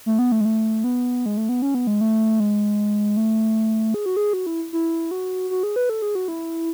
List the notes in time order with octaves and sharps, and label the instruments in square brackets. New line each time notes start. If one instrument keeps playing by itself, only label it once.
[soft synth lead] A3
B3
A3
G#3
A3
B3
G#3
A3
B3
C#4
B3
G#3
A3
G#3
A3
G#4
F#4
G#4
F#4
E4
E4
F#4
F#4
G#4
B4
A4
G#4
F#4
E4